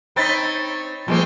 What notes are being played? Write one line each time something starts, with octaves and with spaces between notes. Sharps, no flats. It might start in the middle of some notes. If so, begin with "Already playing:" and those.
C4 D#4 C#5 B5 A6 B6
E2 F3 G3 G#3 A#3 C4